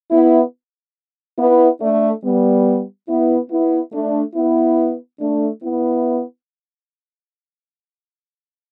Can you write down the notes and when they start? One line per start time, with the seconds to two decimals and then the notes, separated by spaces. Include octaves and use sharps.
0.11 B3 E4
1.38 B3 E4
1.81 A3 D4
2.23 G3 B3
3.08 B3 E4
3.51 B3 E4
3.93 A3 D4
4.35 B3 E4
5.20 A3 D4
5.62 B3 E4